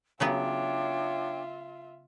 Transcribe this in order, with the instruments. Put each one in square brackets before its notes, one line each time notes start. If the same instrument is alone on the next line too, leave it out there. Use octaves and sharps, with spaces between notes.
[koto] C#3 F#3 B3 [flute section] D4 C#5 G5 [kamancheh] F4 E5